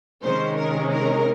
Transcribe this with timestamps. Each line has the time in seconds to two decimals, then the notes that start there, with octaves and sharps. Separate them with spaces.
0.23 C3 D#3 G#3 C#4 C5
0.57 A#4
0.92 A#4